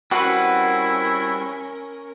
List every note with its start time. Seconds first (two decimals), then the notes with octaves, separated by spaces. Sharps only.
0.11 G3 C4 C#4 E4 F#4 A#4 B4 F#5